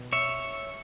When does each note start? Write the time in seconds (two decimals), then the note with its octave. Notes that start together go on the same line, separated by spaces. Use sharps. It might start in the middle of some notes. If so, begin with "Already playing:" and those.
Already playing: B2
0.13 C#5 E5